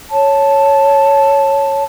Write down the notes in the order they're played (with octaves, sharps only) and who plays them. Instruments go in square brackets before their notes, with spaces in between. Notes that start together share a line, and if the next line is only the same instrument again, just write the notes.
[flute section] C#5 A5